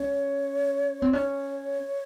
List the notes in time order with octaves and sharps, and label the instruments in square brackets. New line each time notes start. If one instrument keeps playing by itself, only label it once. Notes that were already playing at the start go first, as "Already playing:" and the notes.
Already playing: [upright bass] C#4 [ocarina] C#5
[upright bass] C4
[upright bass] C#4 [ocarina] C#5